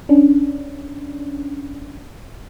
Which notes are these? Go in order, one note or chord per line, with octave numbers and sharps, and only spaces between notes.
C#4 D4